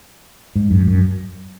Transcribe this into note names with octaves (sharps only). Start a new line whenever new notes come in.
G#2
F#2
F#2